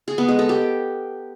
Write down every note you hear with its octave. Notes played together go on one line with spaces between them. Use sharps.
G#4
B3
G#3
A4
G4